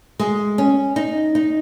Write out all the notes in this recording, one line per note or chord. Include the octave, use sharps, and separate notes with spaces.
G#3
C#4
D#4
D#4